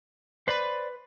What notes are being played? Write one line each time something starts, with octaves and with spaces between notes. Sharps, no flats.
B4 C5 D5 B5